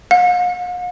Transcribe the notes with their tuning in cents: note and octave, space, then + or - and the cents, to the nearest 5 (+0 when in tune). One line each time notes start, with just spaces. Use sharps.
F5 +45